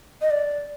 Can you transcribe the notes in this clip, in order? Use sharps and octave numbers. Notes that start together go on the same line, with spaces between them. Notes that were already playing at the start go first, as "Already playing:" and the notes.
D#5
D5